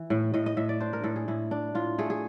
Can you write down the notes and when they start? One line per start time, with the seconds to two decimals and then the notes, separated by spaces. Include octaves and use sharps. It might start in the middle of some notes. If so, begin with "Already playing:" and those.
Already playing: E3
0.10 A2
0.34 A2 D#5
0.46 D#5
0.57 A2 E5
0.69 D5
0.80 D4 C5
0.93 A#4
1.04 A2 A4
1.16 G#4
1.28 A2 E4
1.51 D4
1.75 A2 F4
1.98 A3 G#4
2.10 G#4